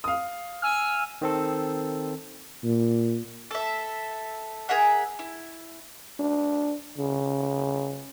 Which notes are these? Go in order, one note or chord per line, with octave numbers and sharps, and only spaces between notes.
F5 D#6
G#5 E6 F6
D#3 C4 A4
A#2
A4 E5
G#4 A#4 E5 F#5
E4
D4
C#3